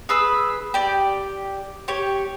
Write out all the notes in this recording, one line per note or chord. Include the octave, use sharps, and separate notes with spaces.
G#4 B4 E6
G4 D5
G4 C#5